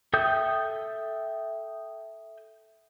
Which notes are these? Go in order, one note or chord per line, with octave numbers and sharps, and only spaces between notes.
A4 E5 G5 D#6 G6